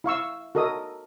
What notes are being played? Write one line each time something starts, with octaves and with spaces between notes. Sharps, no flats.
E4 F5 C#6 E6
F#4 A4 A#4 D#5 D#6